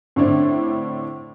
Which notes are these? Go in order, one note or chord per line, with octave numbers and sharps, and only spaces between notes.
A2 D3 C4 D4 E4